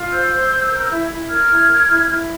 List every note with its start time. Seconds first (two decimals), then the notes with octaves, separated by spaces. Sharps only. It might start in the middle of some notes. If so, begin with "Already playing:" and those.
Already playing: F4
0.11 C5 E6 G6
0.31 C5
0.50 C5
0.70 A#4
0.91 E4
1.10 E4
1.29 A#4 F6 G#6
1.50 E4
1.68 A#4
1.89 E4
2.09 E4